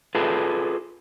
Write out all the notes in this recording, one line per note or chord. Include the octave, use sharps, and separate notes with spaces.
F4 G#4 A4 B4